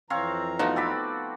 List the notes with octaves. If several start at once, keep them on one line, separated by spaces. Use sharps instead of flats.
F2 E3 C4 C#5 F5 A#5
F3 A3 B3 D#4 F#4
C4 D5 B5